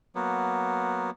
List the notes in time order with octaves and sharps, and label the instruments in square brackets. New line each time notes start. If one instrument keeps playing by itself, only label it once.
[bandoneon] F#3 A#3 B3